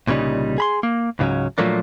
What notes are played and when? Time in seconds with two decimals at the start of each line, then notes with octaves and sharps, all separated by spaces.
0.07 C2 A#2 C#3 G3 D#4
0.58 G#4 B5 C6
0.83 A#3
1.19 C#2 G#2 C#3 F#3 C#4
1.58 A#2 F3 F#3 A3 A#3 D4